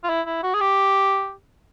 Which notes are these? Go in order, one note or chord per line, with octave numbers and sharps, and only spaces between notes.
F4
E4
E4
F#4
G#4
G4